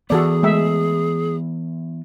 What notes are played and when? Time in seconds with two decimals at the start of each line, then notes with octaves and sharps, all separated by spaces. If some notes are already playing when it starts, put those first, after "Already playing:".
0.10 E3 B3 F#4 G#4 A4 D5
0.43 G#3 A3 E5